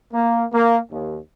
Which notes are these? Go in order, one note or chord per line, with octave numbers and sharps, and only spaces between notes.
A#3
A#3
D#2